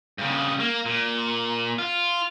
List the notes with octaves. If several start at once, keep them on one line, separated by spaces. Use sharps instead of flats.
G2 C#3
A#3
A#2
F4